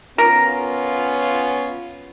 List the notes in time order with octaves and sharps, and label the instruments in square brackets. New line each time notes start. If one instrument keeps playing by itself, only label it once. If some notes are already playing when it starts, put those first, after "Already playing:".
[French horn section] B3 C#4 F4 [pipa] A#4